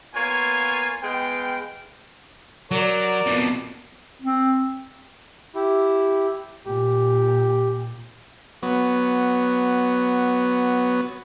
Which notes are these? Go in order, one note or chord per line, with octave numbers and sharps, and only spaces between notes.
A#3 B3 F4 C#5 G#5
G#3 B3 F5 G5
F#3 A#4 D5
F2 B2
C4
E4 G4
A#2 G4
F#3 B3